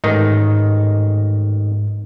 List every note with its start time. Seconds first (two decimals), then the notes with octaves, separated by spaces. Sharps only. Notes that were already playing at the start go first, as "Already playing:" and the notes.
0.04 A1 G#2 D#3 D#4